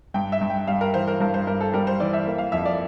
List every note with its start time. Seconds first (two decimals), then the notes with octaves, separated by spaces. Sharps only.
0.14 G2 G5
0.32 E5
0.41 G2
0.50 G5
0.67 G3 F5
0.81 A#4
0.94 E3 C5
1.07 A#4
1.20 G2 A#4
1.34 C5
1.47 G2 A#4
1.60 A4
1.73 G3 A#4
1.87 C5
2.00 E3 D5
2.13 E5
2.27 A#3
2.38 F5
2.52 F2 E5
2.65 D5